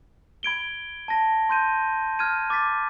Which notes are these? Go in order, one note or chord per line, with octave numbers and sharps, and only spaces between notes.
B5 G#6 D7 G7
A5 A#6
C6 G6 D#7
F6 G#6 D#7
D6 A6 B6